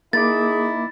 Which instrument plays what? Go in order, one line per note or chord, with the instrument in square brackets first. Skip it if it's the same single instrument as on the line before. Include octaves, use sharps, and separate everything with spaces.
[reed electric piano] A#3 D6 [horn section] D#4 E4 [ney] G#4 [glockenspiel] A6